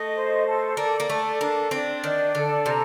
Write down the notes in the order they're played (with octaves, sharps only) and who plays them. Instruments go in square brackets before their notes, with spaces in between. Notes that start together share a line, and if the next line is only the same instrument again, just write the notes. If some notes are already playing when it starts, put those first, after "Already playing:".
Already playing: [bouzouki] A3 [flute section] D#5
[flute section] C5
A4
[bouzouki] A#3 [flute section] D5
[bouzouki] A#3
[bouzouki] A3 [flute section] A4
[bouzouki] A#3 [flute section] D4
[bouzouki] C4 [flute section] D4
[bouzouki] D#3 [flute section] D5
[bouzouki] D3 [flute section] A4
[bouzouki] C3 [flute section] A#5